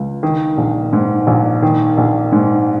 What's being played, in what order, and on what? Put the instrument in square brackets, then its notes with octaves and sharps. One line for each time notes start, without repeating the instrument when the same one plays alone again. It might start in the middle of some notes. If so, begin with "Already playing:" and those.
Already playing: [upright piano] C#2
D#3
A#1
G#2
A#1
D#3
A#1
G#2